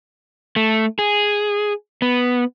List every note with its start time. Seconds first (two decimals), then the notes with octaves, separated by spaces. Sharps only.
0.56 A3
0.99 G#4
2.02 B3